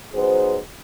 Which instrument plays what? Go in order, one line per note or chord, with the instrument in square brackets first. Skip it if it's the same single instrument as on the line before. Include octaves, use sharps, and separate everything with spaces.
[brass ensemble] F#3 B3 D#4 G#4 C5